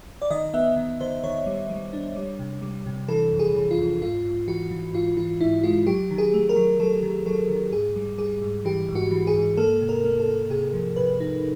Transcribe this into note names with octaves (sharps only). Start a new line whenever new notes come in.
D5
D#3 D#5
B3 E5
D#3
D#3 C5
D#3 C#5
G3
G3
D4
G3
C3
G3
C3
E3 A4
F2
G#4
E3
F4
F2
G#2 F4
G#2
E3 F#4
E3
G#2 F4
E3 F4
G#2 E4
G#3 F4
F#3 G4
D#3
G#4
A3
A#4
F#3
F#3 A4
D#3
F#3 A4
D#3
G#2 G#4
G3
G3 G#4
G#2
E3 G4
G#2
F#4
E3
G#4
G#2
A#3 A4
C3
A#4
A#3
A4
A#3
C3 G#4
F3
C3 B4
D#4